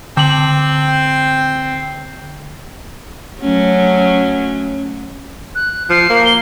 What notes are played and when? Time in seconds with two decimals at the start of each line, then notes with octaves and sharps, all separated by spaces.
0.17 D3 C4 F#7
3.41 F#3 A3 C#4
5.55 F#6
5.90 F3 C7
6.10 A#3
6.25 G7